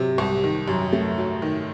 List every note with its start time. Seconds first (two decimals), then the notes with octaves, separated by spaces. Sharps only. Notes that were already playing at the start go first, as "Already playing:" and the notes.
Already playing: C3 F#3
0.18 C2
0.44 D#3
0.68 F#2
0.93 A3
1.18 F#3
1.42 D#3